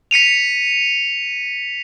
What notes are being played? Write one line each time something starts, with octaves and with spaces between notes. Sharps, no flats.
B6 C#7 D#7 F7